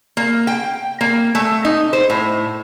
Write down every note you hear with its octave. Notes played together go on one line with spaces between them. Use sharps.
A#3
G5
A#3
A3
D#4
C5
A2